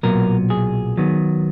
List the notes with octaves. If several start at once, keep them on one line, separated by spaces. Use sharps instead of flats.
B1 A#2 F#3 B3 A#4
G#4
D#3 F#3 B3